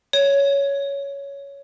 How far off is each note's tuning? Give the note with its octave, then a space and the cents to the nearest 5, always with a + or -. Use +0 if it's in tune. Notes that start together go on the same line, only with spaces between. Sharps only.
C#5 +10